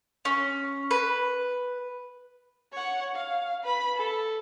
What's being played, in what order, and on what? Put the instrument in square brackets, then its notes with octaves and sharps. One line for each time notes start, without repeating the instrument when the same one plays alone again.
[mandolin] C#4
B4
[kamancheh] C#5 F#5
F5
B4 B5
A4